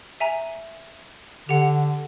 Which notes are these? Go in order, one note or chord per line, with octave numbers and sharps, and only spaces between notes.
E5 G#5 A#5
D3 G4 F#5